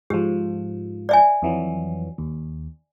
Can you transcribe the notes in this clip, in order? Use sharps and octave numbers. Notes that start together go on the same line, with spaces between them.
G#2 F3 G4
D5 E5 G#5
F2 E3 F#3
D#2